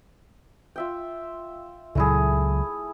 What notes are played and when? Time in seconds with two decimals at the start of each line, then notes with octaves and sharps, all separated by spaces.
0.76 F4 E5 G5
1.95 C#2 A#2 F#3 A3 E4 G#4